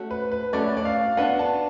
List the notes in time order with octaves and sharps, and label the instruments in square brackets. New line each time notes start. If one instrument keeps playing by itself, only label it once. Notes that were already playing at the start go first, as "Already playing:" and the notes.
Already playing: [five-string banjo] A3 C#4 F#4
[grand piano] B4
B4
[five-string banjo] A3 C#4 F#4 [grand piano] D5
[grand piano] D5
F5
[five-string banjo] B3 D4 F#4 B4 [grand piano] F#5
[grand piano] A5